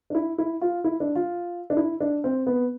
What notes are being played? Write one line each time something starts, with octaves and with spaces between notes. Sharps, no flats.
D4
E4
E4
F4
E4
D4
F4
D4
E4
D4
C4
B3